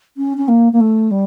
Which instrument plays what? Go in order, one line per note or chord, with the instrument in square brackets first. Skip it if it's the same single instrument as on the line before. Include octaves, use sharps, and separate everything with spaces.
[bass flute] C#4
C#4
A#3
A#3
A3
G3